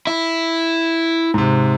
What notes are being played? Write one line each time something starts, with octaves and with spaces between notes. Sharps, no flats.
E4
G#2 C3